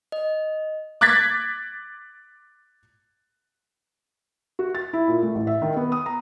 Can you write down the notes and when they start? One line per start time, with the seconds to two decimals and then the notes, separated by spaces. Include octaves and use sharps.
0.12 D#5
1.01 D6 F#6 G#6 A6 B6
4.59 F#4
4.75 A6
4.93 E4
5.08 A#2
5.23 A3
5.35 A1
5.47 E5
5.62 D#3
5.77 B3
5.92 D#6
6.06 A#5